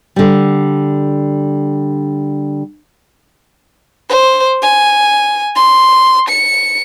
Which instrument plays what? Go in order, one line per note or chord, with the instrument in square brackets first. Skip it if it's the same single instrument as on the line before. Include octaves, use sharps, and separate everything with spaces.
[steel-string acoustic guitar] D3 G3
[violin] C5
G#5
C6
C#7